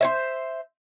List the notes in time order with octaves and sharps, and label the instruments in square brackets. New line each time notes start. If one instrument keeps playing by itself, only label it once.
[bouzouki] C5 C#5 E5